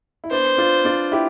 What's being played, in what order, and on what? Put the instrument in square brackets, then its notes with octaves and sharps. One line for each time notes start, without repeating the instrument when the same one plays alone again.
[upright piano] E4
[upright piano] B3 D4 [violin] C5
[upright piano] D4 F4
D4 F4
E4 G4